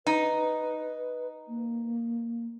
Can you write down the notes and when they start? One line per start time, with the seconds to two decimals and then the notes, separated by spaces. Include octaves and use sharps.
0.07 D#4 B4
1.48 A#3